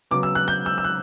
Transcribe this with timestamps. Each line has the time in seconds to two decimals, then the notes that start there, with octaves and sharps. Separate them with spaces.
0.11 C#3 F#3 B3 D6
0.23 E6
0.35 F#6
0.48 G6
0.66 E6
0.78 E6
0.84 F#6